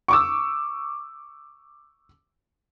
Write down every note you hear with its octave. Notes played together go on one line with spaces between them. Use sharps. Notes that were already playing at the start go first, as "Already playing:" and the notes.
C#6 D6 E6